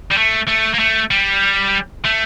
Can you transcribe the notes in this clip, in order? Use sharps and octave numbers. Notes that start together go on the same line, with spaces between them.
G3
A3
A3
A#3
A3
G3
A3